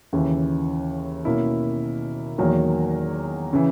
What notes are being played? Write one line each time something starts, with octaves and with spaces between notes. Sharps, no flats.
D#2 C#3 E3
B2 A#3 C#4 E4
E2 D#3 F#3 A#3
C#3 E3